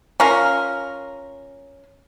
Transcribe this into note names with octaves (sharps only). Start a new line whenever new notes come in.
C#4 F4 A#4